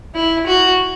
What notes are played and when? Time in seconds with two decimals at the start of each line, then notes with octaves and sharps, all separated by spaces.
0.15 E4
0.46 F#4